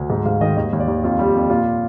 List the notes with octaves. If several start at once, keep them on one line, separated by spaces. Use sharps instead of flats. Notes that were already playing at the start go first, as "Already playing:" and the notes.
Already playing: D2
G#2
G#2 F5
D#3 D#5
D#2 D#5
D#2
D5
D#2
F2 F4
G3
G4
F2
A#2 F4